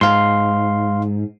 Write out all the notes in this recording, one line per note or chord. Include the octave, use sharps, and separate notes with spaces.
G#2 F5 C6